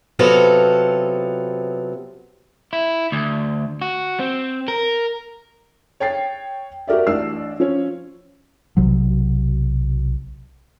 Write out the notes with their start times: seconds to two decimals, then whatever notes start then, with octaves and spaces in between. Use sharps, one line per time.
0.19 C3 F#3 B3 F4 A4
2.73 E4
3.12 D2
3.82 F#4
4.19 C4
4.68 A#4
6.00 C#5 G5 A6 C7
6.88 F#4 G4 A#4 D5 E5
7.07 A1 D4 D5 E6 C7
7.60 F3 C#4 C#5
8.77 B1 C3 F#3